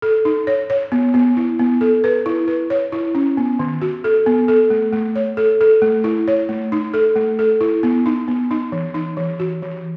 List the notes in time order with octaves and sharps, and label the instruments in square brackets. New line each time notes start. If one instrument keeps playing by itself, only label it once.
[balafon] A4
D#4
C#5
C#5
B3
B3
E4
B3
A4
B4
E4
B4
C#5
E4
C#4
B3
D#3
F#4
A4
B3
A4
A3
A3
C#5
A4
A4
A3
E4
C#5
A3
D#4
A4
A3
A4
E4
B3
D#4
B3
D#4
E3
D#4
E3
F#4
E3